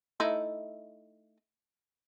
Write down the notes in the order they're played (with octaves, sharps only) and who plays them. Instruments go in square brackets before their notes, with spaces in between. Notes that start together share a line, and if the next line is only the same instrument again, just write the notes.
[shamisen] A3 D#4 E4